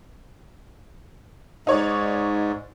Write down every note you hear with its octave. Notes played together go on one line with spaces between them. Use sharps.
G#2 D#4 C#5 D5